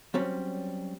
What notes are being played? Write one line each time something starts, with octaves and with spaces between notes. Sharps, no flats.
F#3 G3 C4 C#4